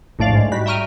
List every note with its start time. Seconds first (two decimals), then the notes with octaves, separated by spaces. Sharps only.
0.19 A#1 A2 A3 D5 F5
0.32 G#2 G#3
0.52 G3 F#4 B6
0.66 E5 G5 A#5 C#6 F6 D#7